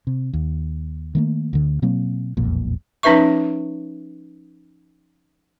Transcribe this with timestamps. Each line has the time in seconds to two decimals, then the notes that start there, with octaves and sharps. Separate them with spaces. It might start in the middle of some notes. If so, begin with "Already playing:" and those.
0.07 C3
0.33 D#2
1.15 D#3 A3 A#3
1.53 D2 D3
1.82 B2 F#3 A#3 C4
2.37 E1 B1 F2 A#2
3.03 F3 C#4 D#4 B4 E5 C#6